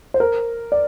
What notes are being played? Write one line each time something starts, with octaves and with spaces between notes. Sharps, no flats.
C5
A#4
D5